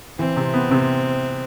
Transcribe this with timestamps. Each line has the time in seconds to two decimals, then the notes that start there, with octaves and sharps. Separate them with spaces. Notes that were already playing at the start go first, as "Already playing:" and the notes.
0.19 E3 C4
0.36 C3
0.54 B3
0.71 C3